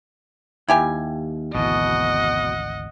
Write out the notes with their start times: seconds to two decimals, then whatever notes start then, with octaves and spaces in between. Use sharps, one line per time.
0.68 D#2 E4 G4 G#5
1.55 G#1 D2 B2 E3 D#5 F#5